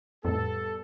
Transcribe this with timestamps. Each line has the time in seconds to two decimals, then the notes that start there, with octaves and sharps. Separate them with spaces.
0.25 F2 A2 G3 B3 A4